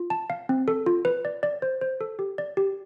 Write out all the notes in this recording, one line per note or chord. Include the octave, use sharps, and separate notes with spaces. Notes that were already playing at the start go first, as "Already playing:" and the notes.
Already playing: F4
A5
F5
C4
A4
F4
B4
D5
D5
C5
C5
A4
G4
D5
G4